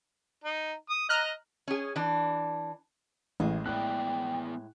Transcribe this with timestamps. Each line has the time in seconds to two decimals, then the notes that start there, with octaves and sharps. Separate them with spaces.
0.44 D#4
0.90 D#6
1.09 D#5 A#5 F6 F#6
1.68 C#4 G#4
1.96 E3 D4
3.40 A1 A2 G#3
3.66 B3 E4 D5 G5 F#6